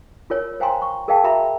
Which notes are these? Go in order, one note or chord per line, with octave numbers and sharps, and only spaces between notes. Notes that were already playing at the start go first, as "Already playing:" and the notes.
F4 A#4 C#5
C5 F5 G5 G#5 A#5 C6
C#6
G#4 A#4 D#5 F5 G5 A5
F#4 A#4 E5 A#5 B5